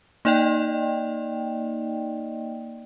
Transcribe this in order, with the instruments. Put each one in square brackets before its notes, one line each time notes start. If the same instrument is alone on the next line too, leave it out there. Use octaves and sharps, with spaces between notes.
[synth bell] A#3 D#4 D5 D#5 G5